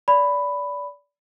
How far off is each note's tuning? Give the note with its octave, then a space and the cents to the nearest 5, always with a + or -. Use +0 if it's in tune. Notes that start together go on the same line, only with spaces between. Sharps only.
D5 -25 B5 +5